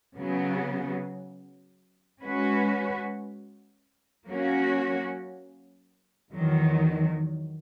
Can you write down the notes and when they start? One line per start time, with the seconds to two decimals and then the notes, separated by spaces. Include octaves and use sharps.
0.16 C#3 F#3 B3
2.22 G#3 C#4 F#4 B4
4.26 F#3 A#3 C#4 F#4
6.33 E2 D#3 F#3